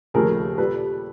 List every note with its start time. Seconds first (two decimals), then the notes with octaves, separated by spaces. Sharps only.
0.14 D#2 C#3 F3 A3 G#4 A#4
0.58 A#2 G3 A4 B4